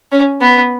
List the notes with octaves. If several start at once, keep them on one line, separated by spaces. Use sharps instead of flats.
C#4
B3